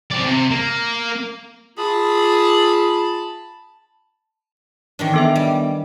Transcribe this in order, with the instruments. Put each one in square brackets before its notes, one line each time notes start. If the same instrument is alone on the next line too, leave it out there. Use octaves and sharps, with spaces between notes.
[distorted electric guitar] C4 D5
C3
A#3
[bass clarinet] F4 [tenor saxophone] G#4 [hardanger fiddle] A5 B5
[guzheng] D#3 E3 D4
[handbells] B3 A4 E5
[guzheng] G3